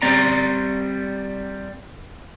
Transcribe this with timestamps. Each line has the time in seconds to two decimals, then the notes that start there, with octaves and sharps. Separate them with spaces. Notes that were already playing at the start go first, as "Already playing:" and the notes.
0.02 G3 C4 D5 A#5